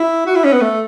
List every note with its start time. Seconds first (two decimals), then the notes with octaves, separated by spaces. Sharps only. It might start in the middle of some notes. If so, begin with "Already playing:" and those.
Already playing: E4
0.27 F#4
0.36 E4
0.45 C#4
0.53 B3
0.61 A3